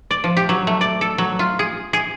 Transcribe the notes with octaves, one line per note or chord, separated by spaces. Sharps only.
D5
F3
G4
F#3
A3
D5
A4
F#3
F4
G#4
G#4